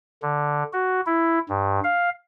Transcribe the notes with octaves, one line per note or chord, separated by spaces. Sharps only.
D3
F#4
E4
G2
F5